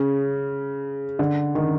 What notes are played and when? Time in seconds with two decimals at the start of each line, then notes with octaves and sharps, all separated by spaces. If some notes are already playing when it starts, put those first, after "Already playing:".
Already playing: C#3
1.19 D3
1.55 D#3